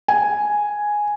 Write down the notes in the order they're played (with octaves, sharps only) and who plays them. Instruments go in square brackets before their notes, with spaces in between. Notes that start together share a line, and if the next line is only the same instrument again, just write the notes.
[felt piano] G#5